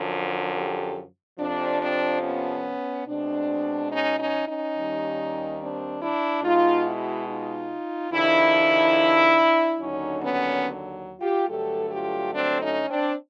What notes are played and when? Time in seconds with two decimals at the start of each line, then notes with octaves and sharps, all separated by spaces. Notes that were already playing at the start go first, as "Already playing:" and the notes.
Already playing: F#2 D3 F3
0.55 G4 A4
1.39 F2 C3 F3 C4 D4
1.81 C4 D4
2.23 B3 C#4
3.08 B2 G#3 C4 D4
3.91 C#4 D#4
4.19 C#4 D#4
4.48 C#4 D#4
4.77 D#2 D#3 G3
5.60 C4 D4
6.02 D4 E4
6.44 B2 G#3 D#4 F4
6.86 E4 F#4
7.28 D#4 F4
8.12 F2 C3 D#3 D4 E4
9.80 D#2 D3 F#3 C#4 D#4
10.24 B3 C#4
11.21 F4 G4
11.49 G2 D3 F#3 A3 G4 A4
11.91 F4 G4
12.33 C4 D4
12.62 C#4 D#4
12.89 C4 D4